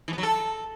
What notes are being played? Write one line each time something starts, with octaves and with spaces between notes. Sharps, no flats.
E3
B3
F#3
A4